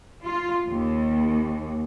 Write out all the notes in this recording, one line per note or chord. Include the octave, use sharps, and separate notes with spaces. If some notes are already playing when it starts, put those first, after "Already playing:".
F4
D#2